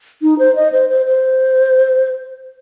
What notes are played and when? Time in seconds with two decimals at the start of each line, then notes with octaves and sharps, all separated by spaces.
0.22 D#4
0.39 C5
0.56 D#5
0.72 C5
0.89 C5
1.06 C5